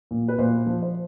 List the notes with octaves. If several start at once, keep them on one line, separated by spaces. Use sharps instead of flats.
A#2
B4
A#2 C5
F3
C5